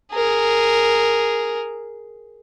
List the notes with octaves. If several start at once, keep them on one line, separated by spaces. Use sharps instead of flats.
G#4 A#4